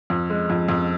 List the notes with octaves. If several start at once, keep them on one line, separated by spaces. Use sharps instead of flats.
F2
G#3
F2
F2